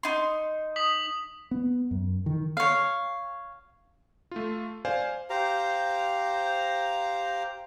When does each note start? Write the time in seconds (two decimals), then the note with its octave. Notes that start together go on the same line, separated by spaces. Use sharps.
0.03 D#4 C6
0.76 D#6 B6 F#7
1.51 B3
1.91 F#2
2.26 D#3
2.57 C#5 F5
4.31 A3 F4
4.85 C5 D5 F5 G#5
5.30 G4 C5 F5 A#5